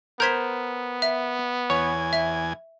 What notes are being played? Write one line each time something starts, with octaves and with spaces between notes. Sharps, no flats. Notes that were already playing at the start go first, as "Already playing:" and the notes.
B3 A#4 C5 G6 G#6 B6
E5
E2 C#5 G#5
E5